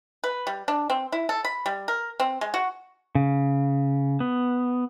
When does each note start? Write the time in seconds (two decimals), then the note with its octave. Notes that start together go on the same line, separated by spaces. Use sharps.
0.24 B4
0.47 G3
0.68 D4
0.90 C4
1.12 E4
1.29 A4
1.45 B5
1.66 G3
1.88 A#4
2.20 C4
2.41 G#3
2.54 F#4
3.15 C#3
4.20 B3